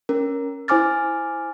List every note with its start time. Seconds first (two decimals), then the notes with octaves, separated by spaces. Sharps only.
0.09 C#4 A#4
0.68 E4 C5 G#5 D6 F6 A6